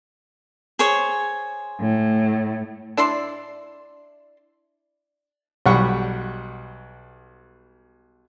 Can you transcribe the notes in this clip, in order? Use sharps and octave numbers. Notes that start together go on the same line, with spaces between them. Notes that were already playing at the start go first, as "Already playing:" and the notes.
G#4 C5 C#5
A2
D4 E4 D5 C6
B1 G3 F#5 B5 C#6